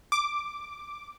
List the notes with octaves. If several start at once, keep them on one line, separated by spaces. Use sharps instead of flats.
D6